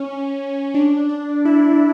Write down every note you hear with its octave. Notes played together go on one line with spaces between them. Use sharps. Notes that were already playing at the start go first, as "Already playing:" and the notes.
Already playing: C#4
D4
D4
E4